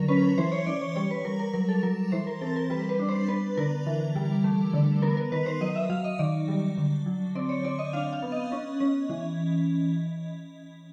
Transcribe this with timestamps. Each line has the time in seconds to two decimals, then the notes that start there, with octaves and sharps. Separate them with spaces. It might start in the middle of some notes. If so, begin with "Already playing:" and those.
Already playing: D3 F#3 A#4
0.08 C#4 B4
0.38 E3 C5
0.52 C#5
0.66 E3 D5
0.81 C#5
0.96 G3 C#5
1.11 B4
1.25 G3 A#4
1.39 A#4
1.54 F#3 A#4
1.69 A4
1.83 F#3 A#4
2.12 E3 C5
2.27 A#4
2.41 C4 A4
2.56 A#4
2.70 G3 B4
2.89 B4
2.99 D4
3.09 C5
3.28 B3 B4
3.57 D3 A#4
3.86 E3
4.16 G3
4.44 A3
4.73 D3
5.02 B3 A#4
5.17 A#4
5.32 D#3 B4
5.46 C5
5.61 F#3 D#5
5.75 E5
5.89 F#3 F5
6.04 D#5
6.19 D#3 D5
6.48 G3
6.77 D3
7.06 F#3
7.35 C4 D5
7.49 C#5
7.64 C4 D5
7.79 D#5
7.93 D4 F5
8.13 F5
8.22 B3
8.32 D#5
8.52 C#4
8.80 C#4
9.10 E3